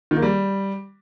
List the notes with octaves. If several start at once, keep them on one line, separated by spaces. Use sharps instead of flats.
D#3
A#3
G3